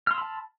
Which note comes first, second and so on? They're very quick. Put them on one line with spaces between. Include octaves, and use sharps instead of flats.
F6 C6 E6 B5 A5